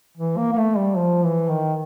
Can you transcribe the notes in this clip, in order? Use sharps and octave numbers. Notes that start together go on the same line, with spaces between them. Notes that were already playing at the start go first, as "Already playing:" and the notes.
E3
A#3
A#3
A3
G3
F3
E3
D#3